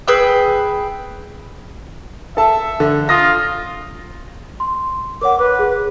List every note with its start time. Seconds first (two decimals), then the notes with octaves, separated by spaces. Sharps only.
0.08 G#4 B4 G5 E6
2.37 A4 E5 A5
2.80 D3
3.09 F4 D#6 A#6
4.60 C6
5.21 A#4 C#5 F#5 D6
5.39 B4 D6
5.59 G#4